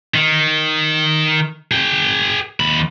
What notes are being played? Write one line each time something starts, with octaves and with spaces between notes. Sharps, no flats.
D#3
G#4 G5
D#2 B5